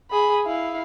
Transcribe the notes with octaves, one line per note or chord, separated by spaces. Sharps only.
G#4 B5
E4 F5